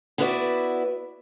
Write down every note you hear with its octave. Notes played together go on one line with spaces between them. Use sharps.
B3 E4 F#4 B4 C#5 D5